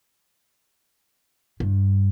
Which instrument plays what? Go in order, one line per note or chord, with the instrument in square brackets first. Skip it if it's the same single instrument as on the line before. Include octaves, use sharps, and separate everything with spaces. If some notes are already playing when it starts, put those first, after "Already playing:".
[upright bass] G2